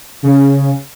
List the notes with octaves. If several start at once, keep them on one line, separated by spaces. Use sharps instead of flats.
C#3